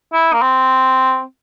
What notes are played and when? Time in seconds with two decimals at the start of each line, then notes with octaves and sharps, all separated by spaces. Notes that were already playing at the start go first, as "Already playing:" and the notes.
0.13 E4
0.33 A#3
0.42 C4